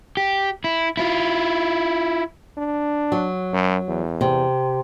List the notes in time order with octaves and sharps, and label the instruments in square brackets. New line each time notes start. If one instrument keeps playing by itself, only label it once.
[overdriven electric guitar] G4
E4
E4 F4
[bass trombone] D4
[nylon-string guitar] F#3
[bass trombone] F#2
E2
[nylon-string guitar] C3